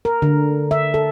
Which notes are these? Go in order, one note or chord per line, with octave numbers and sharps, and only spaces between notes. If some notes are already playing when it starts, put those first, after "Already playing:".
A#4
D3
E5
A4